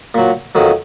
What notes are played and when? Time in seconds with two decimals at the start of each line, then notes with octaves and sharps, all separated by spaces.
0.14 A#2 F#3
0.55 F2 D#3 F#3